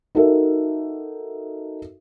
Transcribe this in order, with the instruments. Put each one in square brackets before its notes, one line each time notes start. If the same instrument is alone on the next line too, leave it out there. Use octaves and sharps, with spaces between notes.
[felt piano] D#4 F#4 A4 A#4 E5